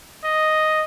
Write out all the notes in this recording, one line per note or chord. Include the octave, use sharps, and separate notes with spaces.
D#5